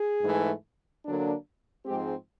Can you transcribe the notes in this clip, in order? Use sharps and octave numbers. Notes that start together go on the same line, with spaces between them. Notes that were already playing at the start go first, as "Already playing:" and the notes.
Already playing: G#4
G#2 E3 A3
D3 F#3 A#3 D4
G#2 F3 G#3 C4 G4